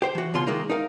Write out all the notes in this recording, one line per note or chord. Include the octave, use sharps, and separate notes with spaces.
G4 C5 G5
E3 F#4
C#2 B2 F4 C6
D#3 G#3 A#3 D#4
D#4 A#4 F5